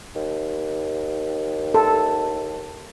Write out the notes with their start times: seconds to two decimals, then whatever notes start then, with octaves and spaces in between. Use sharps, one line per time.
0.15 D#2
1.74 A4